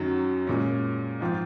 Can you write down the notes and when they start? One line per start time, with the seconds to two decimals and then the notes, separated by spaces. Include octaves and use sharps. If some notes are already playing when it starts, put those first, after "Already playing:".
Already playing: F#2 D#3 F#3
0.47 A#2 G#3 C#4
1.20 G#2 F3 C4 F4